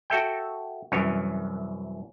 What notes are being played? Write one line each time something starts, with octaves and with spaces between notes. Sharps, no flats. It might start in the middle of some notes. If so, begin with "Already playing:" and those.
F#4 A4 E5 G5
C2 F#2 E3 C#4 C#5